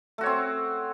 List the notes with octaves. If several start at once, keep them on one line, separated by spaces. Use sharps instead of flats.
A3 C4 F#4 C#5